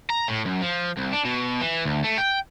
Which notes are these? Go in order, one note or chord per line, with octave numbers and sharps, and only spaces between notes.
A#5
A2
F#2
F3
C2
D4
B2
E3
D2
A3
G5